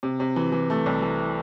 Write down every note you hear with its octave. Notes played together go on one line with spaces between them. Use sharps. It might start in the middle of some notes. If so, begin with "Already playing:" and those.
C3
C3
E3
E3
A3
C2
E3